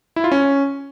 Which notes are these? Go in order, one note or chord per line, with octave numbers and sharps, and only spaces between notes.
E4
F4
C#4